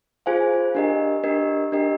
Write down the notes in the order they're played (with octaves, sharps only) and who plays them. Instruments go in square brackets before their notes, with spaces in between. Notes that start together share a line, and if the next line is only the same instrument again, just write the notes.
[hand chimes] F4 G#4 C5 F5 G#5
D4 G4 A#4 D#5
D4 G4 A#4 D#5
D4 G4 A#4 D#5